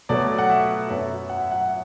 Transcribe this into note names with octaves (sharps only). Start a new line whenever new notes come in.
B2 F#3 A3 D5
F#5
E5
F#2 F#3 B3 E5
F#5
E5
F#5